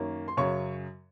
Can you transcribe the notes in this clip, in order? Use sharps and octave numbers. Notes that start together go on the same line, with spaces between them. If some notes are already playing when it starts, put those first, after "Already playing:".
Already playing: F#2 D#3 A#3 C#4
C6
F#2 C#3 F#3 C#5 C#6